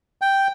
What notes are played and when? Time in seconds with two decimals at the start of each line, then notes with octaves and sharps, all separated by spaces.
0.22 G5